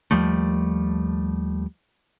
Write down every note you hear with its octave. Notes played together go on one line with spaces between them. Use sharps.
D#2 F3 G3 A3